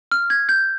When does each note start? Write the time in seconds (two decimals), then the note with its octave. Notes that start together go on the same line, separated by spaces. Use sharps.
0.11 F6
0.30 G#6
0.49 G6